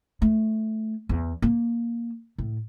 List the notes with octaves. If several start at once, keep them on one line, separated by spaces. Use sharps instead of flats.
A3
E2
A#3
A2